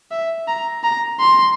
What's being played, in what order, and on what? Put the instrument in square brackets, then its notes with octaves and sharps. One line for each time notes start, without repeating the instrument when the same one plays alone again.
[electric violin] E5
A#5
A#5
C6